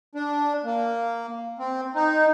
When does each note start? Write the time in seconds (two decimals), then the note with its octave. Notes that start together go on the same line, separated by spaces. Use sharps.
0.15 D4
0.65 A#3
1.59 C4
1.95 D#4